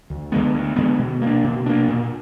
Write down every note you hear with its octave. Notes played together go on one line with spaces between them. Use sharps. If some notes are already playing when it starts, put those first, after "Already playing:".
D2
D3 G#3 B3
D2
D3 G#3 B3
B2
A#3 D4
B2
A#3 D4
A#2